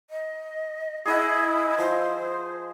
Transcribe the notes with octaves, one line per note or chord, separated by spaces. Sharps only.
D#5
E4 G#4 D#5 F#5
F3 C5